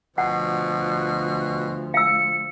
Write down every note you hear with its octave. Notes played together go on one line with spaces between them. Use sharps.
D2 B2 F3 F#5
F5 E6 C#7